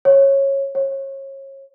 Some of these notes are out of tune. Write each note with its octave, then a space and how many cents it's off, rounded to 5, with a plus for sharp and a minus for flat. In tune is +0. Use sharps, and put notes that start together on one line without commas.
C#5 -15
C#5 -30